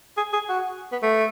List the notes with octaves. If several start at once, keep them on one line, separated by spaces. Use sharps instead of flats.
G#4
G#4
F#4
B3
A3